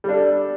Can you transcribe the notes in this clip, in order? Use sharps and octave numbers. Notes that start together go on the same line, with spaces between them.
G3 D4 A4